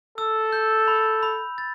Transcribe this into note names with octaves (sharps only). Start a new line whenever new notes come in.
A4 E6
G6
B5
B5
A6